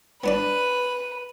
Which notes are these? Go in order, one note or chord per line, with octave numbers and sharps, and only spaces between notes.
B3 D4 B4 D5 D#7